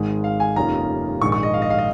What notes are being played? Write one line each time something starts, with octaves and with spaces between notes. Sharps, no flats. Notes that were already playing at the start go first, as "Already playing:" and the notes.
Already playing: G#1 G#2 D#3 G#3
F5
G#5
F1 D#2 D#3 C#4 F4 A#5
A#1 G#2 D#3 C#6
C#6
D#5
F5
D#5
F5
D#5